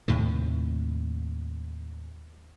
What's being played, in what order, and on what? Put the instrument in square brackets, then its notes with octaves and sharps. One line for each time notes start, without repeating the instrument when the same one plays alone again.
[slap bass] D#2 A2 C3 D#3